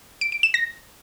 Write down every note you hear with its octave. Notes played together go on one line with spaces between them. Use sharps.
D7
D7
E7
A#6